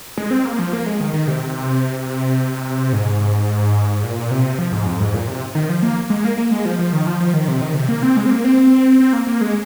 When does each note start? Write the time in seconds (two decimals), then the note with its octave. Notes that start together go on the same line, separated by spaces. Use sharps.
0.18 G#3
0.31 C4
0.45 A#3
0.59 F3
0.73 A#3
0.86 G#3
1.00 D#3
1.14 D#3
1.28 C3
2.93 G#2
4.03 A#2
4.31 C3
4.58 F3
4.72 G#2
4.87 F2
5.00 G#2
5.14 A#2
5.27 C3
5.55 D#3
5.69 F3
5.83 A#3
6.10 G#3
6.24 A#3
6.37 A#3
6.51 G#3
6.65 F3
6.79 F3
6.93 D#3
7.07 F3
7.20 F3
7.33 D#3
7.48 C3
7.62 D#3
7.75 C3
7.89 A#3
8.03 C4
8.17 G#3
8.26 C4
8.31 A#3
8.44 C4
9.00 C4
9.13 A#3
9.27 A#3
9.41 G#3